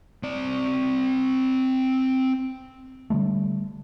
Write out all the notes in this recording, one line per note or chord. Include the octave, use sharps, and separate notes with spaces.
C4 D5
D3 F3 G3 A3